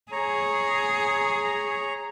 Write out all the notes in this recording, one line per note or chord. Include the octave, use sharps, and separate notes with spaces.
G#4 C#5 A#5